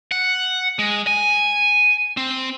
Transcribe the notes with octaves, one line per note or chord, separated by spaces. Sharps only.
F#5
G#3
G#5
C4